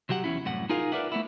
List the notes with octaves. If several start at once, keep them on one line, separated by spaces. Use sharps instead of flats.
C3 F#3 G4 F#5
E2 G2 C#4 E4
C2 F#2 A2 F#5
D#4 F4 G#4 A#4 F5
A#4 B4 D5 E5 F#5
A3 B3 E4